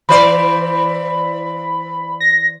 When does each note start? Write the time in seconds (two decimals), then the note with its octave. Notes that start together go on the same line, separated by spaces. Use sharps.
0.09 E3 C5 D5 B5
2.20 A#6